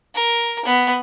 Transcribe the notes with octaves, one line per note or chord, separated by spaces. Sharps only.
A#4
B3